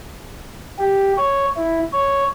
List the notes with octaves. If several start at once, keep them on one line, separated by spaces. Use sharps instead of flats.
G4
C#5
E4
C#5